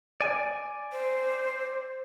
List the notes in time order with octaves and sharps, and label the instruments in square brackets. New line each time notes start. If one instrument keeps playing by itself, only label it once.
[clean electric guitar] D5 G#5
[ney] C5